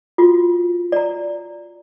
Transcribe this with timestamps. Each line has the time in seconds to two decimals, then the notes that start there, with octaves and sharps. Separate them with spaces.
0.18 F4 F#4
0.92 D5 A#5